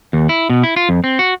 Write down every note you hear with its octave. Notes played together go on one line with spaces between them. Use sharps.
D#2
E4
B2
E4
F4
F2
C4
F#4